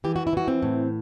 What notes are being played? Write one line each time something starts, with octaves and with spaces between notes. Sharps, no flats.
E3 G4
F#4
E4
E3 F#4
C4
A2